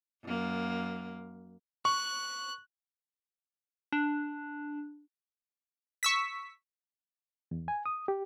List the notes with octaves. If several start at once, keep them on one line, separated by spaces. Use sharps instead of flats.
F#2 A#3
C#6 F#6
D4
C#6 E6 B6
E2
G#5
D#6
G4